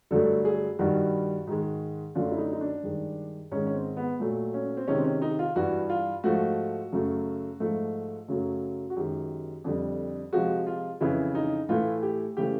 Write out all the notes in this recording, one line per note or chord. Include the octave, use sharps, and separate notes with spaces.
G2 D3 F#3 A3 A4
G#4
G2 D#3 G3 F#4
G#2 D#3 G#3
F#2 D3 F#3 A3 F4
E4
D#4
D#4
D4
G2 D#3 G#3
G#2 D#3 G#3 C#4
C#4
C4
B3
A#2 F#3 A3
C#4
C4
C3 D#3 G#3 C#4
C4
C#4
D#4
F4
G2 E3 G3 F#4
F4
G#2 F3 A3 F#4
F#2 C#3 F#3 A3
G#2 F3 A3
F#2 C#3 F#3 A3
F#4
F#2 D#3 G#3 G4
F2 D3 G3
C3 F3 G#3 F#4
F4
F2 C#3 E3 E4
D#4
A2 E3 A3 F4
G4
C#3 E3 A3 G4